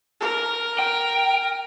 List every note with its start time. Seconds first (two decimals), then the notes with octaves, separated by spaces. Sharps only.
0.20 A#4
0.79 G5